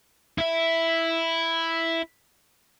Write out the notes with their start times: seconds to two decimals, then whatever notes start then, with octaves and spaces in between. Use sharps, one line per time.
0.38 E4 E5